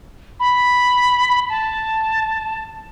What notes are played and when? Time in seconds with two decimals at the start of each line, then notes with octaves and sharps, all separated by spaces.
0.40 B5
1.50 A5